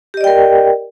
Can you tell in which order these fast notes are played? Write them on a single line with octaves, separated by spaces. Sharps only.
G4 D#5 D5 G5 A#4